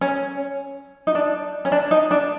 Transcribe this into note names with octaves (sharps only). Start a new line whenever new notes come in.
C#4
D#4
D4
C#4
D4
D#4
D4